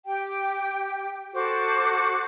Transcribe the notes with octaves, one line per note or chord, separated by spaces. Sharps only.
G4 G5
F#4 A4 C5 D6